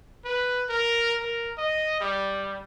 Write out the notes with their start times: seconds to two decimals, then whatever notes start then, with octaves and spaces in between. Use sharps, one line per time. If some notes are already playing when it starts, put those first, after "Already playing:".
0.25 B4
0.69 A#4
1.20 A#4
1.58 D#5
2.00 G3